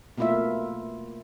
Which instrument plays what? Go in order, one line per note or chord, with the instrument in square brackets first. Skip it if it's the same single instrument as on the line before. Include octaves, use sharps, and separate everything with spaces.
[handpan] B2 A3 A#3 E4 F4 E5